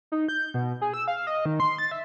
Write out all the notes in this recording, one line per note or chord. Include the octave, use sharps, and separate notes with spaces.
D#4
G6
B2
G#4
E6
F5
D#5
D#3
C6
A6
E5